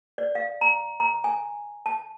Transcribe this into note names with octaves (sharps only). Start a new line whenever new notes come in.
D5
F5
A#5
A#5
G#5
A5